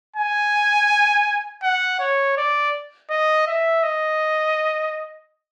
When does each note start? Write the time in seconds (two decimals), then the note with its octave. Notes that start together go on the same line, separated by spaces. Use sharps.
0.16 G#5
1.63 F#5
2.00 C#5
2.37 D5
3.10 D#5
3.47 E5
3.83 D#5